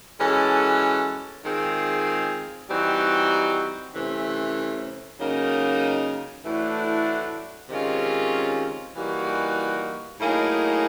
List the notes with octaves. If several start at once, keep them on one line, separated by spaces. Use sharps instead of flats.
E3 G#3 C#4 F#4 A4
D#3 G#3 C4 F4 G#4
E3 G3 C4 D#4 F#4
C3 E3 A3 C#4
C#3 F#3 A#3 D#4
A2 E3 A3 D4 F#4
C3 D#3 G#3 C#4 F4
E3 G3 A#3 D#4 F#4
A2 F#3 A#3 D#4 G#4